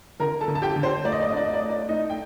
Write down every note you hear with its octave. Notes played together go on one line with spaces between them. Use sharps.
D3 A#4 A#5
A4 A5
D3
A5
G4 G5
D3
C5
A3 D5
D#5
D5
D#5
D4 D5
D#5
D5
A3 D#5
D5
A3 D#4 D#5
G5